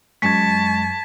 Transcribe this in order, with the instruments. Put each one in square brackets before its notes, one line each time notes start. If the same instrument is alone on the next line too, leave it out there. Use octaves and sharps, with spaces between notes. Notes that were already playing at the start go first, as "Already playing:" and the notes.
[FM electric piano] F#2 C#6 [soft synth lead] G#3 [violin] A5 [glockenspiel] G#6 B6